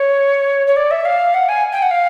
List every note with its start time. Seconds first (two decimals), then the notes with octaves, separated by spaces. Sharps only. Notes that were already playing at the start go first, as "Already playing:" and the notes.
Already playing: C#5
0.67 C#5
0.76 D5
0.91 E5
1.05 F5
1.34 F#5
1.49 G#5
1.72 G5
1.82 F#5
1.91 F5